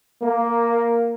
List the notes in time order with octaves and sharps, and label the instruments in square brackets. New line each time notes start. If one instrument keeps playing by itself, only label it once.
[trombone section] A#3